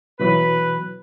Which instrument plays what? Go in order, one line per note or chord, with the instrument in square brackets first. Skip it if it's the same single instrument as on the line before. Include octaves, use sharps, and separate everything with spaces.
[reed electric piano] B2 E3 F#3 [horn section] B4